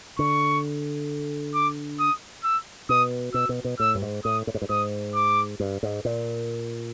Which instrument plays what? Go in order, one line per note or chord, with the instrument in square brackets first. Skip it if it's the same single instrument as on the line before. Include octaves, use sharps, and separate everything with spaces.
[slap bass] D3 [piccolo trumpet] C#6
[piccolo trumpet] D6
D#6
E6
[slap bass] B2 [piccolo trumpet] D#6
[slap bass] B2 [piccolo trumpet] E6
[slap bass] B2
B2
[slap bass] A2 [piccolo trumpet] E6
[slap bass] G2
G#2
[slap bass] A2 [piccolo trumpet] D#6
[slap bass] A2
G#2
G2
[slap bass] G#2 [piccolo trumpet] D#6
[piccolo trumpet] D6
[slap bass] G2
G#2
A#2